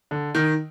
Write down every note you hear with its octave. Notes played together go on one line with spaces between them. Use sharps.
D3
D#3